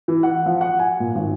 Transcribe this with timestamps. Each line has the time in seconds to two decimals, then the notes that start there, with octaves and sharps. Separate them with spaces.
0.08 E3
0.23 F#5
0.46 F3
0.61 F#5
0.79 G#5
1.00 A#2
1.15 G#1